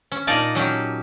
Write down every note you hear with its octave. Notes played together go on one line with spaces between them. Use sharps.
C#4
A#2 A#3 D#4 D5 G#5 A5
F#3 C#4 G4